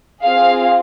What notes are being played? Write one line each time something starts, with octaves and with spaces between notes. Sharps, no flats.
C4 F4 G#4 F5